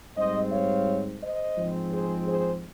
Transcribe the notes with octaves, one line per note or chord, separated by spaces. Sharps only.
G#2 G3 C4 C5 D#5
C#5 F5
C5 D#5
G#2 F3 G#3 C4
G#4 C5
G#4 C5